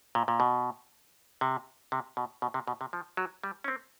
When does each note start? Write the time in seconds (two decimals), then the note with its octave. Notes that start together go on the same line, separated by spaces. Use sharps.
0.15 A#2
0.28 A#2
0.40 B2
1.41 C3
1.92 C3
2.17 B2
2.42 B2
2.54 C3
2.68 B2
2.81 C3
2.93 F3
3.17 F#3
3.44 G3
3.64 C#4
3.68 C4